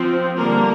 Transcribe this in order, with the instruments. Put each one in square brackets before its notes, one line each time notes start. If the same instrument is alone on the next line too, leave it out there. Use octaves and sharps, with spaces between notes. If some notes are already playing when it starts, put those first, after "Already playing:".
Already playing: [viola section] F3 C4
D3 G3 A#3 A#4